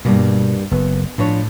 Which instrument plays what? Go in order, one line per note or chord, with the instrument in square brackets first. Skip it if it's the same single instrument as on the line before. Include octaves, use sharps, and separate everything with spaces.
[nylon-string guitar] G2 G3 A#3 [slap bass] B2
[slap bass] F#1 [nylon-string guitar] B3
[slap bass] A2 [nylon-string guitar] F3 D4 C#5